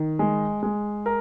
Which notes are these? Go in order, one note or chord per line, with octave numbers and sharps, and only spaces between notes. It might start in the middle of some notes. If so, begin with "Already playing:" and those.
Already playing: D#3
G#3
G#3
A#4